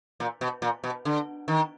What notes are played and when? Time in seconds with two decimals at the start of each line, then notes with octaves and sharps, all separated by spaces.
0.20 A#2
0.41 B2
0.62 A#2
0.84 B2
1.05 D3
1.48 D#3